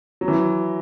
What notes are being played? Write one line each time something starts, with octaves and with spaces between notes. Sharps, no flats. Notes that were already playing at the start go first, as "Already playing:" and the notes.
F#3
E3